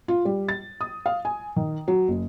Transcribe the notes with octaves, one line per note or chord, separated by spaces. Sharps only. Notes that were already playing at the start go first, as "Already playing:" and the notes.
F4
G3
A6
D#6
F5
G#5
D#3
F#3
F#1